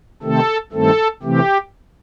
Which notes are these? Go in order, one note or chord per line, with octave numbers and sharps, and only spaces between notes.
C3 D#3 A3 C4 A4
G2 D#3 A3 C4 A4
C3 E3 A3 C4 G4